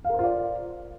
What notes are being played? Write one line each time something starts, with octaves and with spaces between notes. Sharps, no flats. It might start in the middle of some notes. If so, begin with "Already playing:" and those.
F4 A#4 C5 D5 F5